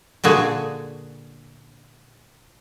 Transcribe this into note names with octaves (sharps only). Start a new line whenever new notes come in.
A#2 D3 F#4 G#4